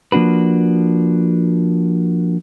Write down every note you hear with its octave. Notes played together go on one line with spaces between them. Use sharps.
F3 A#3 D4 F#4 B4